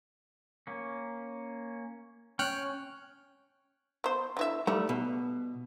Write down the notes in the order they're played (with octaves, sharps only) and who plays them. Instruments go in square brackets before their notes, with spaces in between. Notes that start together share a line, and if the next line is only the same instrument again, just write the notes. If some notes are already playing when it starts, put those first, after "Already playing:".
[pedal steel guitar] A#3 C#4
[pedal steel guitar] C#4 G#5 [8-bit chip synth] G5 F6 F#6
[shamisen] B3 C5
D3 E3 E5
[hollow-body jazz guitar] G3 A3 [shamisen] D#4
[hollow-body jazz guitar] B2